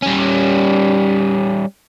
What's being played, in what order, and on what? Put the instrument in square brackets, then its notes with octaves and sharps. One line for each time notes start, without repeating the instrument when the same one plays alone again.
[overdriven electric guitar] G3 C#4